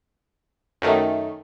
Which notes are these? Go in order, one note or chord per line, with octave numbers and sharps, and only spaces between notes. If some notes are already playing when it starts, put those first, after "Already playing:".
F#2 D#3 A3